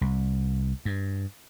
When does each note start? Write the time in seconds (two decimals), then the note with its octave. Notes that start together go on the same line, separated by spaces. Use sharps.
0.01 C2
0.85 G2